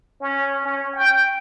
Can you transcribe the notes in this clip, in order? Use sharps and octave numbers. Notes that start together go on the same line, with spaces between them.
C#4
C#4
G5